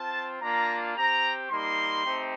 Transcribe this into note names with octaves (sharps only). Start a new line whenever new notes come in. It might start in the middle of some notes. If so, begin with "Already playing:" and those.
Already playing: C4 F4 A5
A#3 D4 F4 A#5
C4 G4 A#5
G3 A#3 D#4 C6
A3 C4 D#4 G4